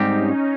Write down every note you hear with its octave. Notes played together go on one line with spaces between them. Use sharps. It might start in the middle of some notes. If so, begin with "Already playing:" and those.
Already playing: G#2 G3 C4 D#4 G4
C#4